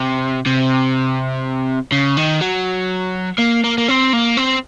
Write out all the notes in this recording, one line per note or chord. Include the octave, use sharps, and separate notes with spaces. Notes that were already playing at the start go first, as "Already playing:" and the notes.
Already playing: C3
C3
C#3
D#3
F#3
A#3
A#3
A#3
C4
A#3
C4